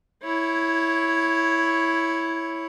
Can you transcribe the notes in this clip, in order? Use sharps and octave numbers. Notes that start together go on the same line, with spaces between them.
E4 C#5